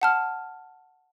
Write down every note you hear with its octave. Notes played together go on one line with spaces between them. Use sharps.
F#5 A5 F6